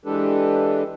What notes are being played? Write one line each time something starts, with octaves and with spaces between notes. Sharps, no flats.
E3 G#3 D4 G4 A4 B4